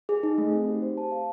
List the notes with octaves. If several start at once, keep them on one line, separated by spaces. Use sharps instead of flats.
G#4
D#4
A3
C4
G4
C5
A5
F5